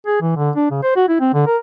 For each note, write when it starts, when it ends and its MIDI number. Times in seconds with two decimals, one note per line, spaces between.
0.07 0.18 68
0.21 0.32 52
0.36 0.50 50
0.56 0.67 62
0.71 0.79 49
0.83 0.92 72
0.96 1.04 66
1.08 1.20 64
1.20 1.31 60
1.34 1.46 50
1.46 1.57 70